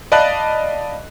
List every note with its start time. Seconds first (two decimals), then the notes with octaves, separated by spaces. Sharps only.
0.12 D5 D#5 F5 A5 B5 F#6